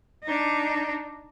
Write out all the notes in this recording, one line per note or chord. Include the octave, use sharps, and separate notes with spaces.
D4 D#4